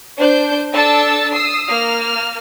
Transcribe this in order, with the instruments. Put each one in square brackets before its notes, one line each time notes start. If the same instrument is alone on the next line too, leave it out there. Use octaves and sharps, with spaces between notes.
[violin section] D4 C5 G6
D4 A4 A5 E6 A6
D#6 E6 C7
A#3 F6